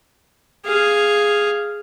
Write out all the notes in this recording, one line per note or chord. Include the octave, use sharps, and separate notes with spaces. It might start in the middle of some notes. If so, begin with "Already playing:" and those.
G#4 F5